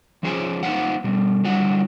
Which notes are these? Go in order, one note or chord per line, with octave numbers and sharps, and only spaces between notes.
F3 C#4 G#4 C5 C#5 G#5
A#3 D#4 B4 C5 F5 F#5
B2 G3
D3 F#3 G3 E4 F#5